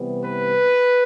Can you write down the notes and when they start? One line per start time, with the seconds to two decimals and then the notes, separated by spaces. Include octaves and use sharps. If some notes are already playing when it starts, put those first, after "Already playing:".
Already playing: C3 E3 G3 B3
0.24 B4